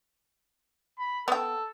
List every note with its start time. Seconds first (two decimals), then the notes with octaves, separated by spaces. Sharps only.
0.98 B5
1.28 B3 A4 G5